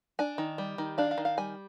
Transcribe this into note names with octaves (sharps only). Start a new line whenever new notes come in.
D4 G#5
D#3
G3
D#3
D4 F5
F5
D#3
F5
G3 G#5